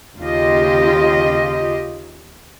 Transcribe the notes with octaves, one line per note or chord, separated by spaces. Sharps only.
D#2 C#3 F4 G4 D#5